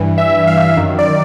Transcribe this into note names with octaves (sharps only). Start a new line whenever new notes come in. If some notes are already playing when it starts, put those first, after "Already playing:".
Already playing: G2 E3
E5
F5
F#2 D#3
D5